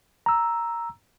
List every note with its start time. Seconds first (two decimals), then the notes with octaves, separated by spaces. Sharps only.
0.26 A#5 E6